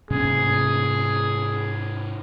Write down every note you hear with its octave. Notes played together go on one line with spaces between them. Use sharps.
G#2 C3 C#4 G#4